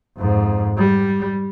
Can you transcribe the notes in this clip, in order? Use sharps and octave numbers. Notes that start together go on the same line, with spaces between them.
F2 G#2
G3